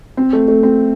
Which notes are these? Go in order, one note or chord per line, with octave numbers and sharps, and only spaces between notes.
C4
A3
A3
C4